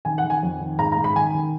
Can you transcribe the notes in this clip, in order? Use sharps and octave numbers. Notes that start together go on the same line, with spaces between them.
D#3 G#5
F#5
D#3
G#5
F2
D#3
G#2 A#5
A#5
G#2
B5
D#3 G#5
D#3